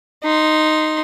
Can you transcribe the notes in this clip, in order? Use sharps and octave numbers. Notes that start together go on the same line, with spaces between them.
D#4 C6